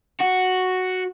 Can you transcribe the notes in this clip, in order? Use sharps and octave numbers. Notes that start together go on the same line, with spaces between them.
F#4